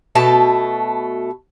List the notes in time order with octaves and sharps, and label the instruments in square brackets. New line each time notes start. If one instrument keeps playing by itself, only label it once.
[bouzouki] B2 A3 A5